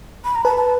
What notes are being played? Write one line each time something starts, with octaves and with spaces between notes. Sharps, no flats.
B5
A#5
B4 A5
A5